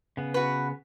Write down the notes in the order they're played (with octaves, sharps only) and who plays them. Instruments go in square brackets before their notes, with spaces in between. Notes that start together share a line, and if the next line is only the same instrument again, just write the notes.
[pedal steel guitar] C#3 B3
[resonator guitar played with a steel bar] F#4 B4